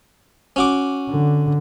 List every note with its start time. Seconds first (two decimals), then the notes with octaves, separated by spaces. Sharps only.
0.56 C#4 F#4 D6
1.10 D3